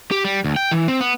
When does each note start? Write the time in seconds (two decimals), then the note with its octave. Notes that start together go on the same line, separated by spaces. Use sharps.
0.11 G4
0.25 G3
0.44 D2
0.56 G5
0.71 E3
0.88 C4
1.01 B3